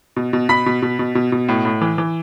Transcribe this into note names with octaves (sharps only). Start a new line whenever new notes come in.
B2
B2
B2 B5 B6
B2
B2
B2
B2
B2
A2
A2
E3
E3